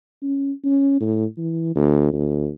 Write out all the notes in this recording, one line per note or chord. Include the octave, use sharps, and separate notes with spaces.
C#4
C#4
A2
E3
D2
D2